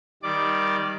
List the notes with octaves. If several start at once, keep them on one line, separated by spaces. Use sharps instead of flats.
D#3 G3 D5 D6